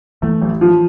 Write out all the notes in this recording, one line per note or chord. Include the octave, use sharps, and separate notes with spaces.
E3 A3
A1
F3